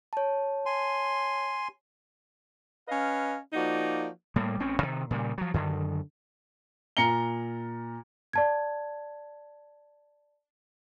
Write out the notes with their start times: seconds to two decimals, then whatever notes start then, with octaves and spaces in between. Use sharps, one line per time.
0.13 C#5 A5
0.66 G#5 C6
2.88 C#4 B4 D#5 F5
3.53 F3 A#3 D#4 F#4 D5
4.36 A2 G3 A#3
4.60 A1 C4 C#4
4.83 C3 D#3
5.11 A#2 C#3 G3
5.38 F3 F#3
5.54 F#2 D3 D#3
6.97 A#2 A#5 C#7 G7
8.33 D5 A5 G#6